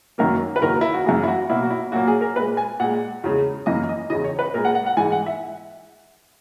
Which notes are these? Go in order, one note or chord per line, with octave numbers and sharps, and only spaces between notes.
F#2 D#3 F#3 A#3 A#4
B4
E2 D#3 F#3 A#3 A#4
E4
F#4
F#2 E3 A#3 G#4
E4
F#4
B2 F#3 A#3 E4
F#4
E4
A#2 F#3 A#3 F#4
G#4
A#4
A#2 G#3 B4
G#5
A#2 G#3 F#5
E2 C#3 G#3
F#2 E3 A#3 D#5
D#5
E2 C#3 E3 D#5
C#5
B4
A#2 G#3 A#4
F#5
F#5
F#5
G#2 E3 G#3 G#5
F#5
E5